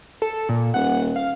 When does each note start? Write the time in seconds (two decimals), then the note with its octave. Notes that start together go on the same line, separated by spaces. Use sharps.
0.22 A4
0.49 A#2
0.74 D#1 F#5
1.16 F5